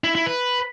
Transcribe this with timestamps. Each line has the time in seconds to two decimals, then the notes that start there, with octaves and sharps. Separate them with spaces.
0.04 E4
0.15 E4
0.26 B4